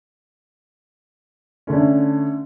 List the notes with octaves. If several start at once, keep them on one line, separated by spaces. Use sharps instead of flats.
D3 A3 C#4